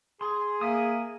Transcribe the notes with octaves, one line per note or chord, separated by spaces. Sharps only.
G#4 C6
A#3 E5 G#5 D#6